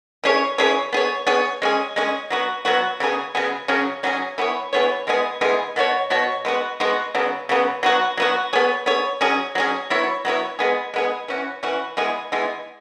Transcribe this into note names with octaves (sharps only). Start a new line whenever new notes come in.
E3 C#4 G#4 C#5
E3 C#4 G#4 C#5
B3 G#4 C#5
B3 G#4 C#5
G#3 C#4 G#4
G#3 C#4 G#4
F#3 B3 F#4
F#3 B3 F#4
C#3 F#3 B3 G#4
C#3 F#3 B3 G#4
C#3 F#3 C#4 G#4
C#3 F#3 C#4 G#4
E3 B3 G#4 C#5
E3 B3 G#4 C#5
E3 G#3 B3 G#4
E3 G#3 B3 G#4
B2 B3 F#4 C#5
B2 B3 F#4 C#5
G#3 B3 F#4
G#3 B3 F#4
C#3 F#3 B3
C#3 F#3 B3
F#3 B3 F#4
F#3 B3 F#4
B3 G#4 C#5
B3 G#4 C#5
F#3 C#4 G#4
F#3 C#4 G#4
F#3 B3 E4 C#5
F#3 B3 E4 C#5
G#3 B3 G#4
G#3 B3 G#4
E3 C#4 F#4
E3 C#4 F#4
E3 G#3 B3 G#4
E3 G#3 B3 G#4